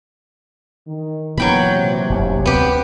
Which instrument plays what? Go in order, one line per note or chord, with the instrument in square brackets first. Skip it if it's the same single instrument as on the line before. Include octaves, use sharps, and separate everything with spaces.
[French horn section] D#3
[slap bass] A#2 E3 [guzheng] F#3 G5 B5 [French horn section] B3
[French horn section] C3
[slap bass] F1 A#1 F#2
[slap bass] D2 C4 [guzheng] B3 G4